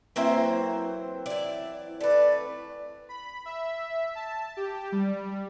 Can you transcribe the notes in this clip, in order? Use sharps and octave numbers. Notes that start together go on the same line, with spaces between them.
E3 F#3 A#3 C4 C5 E5
E4 D5
A3 B4 D5
B5
E5
A5
G4
G3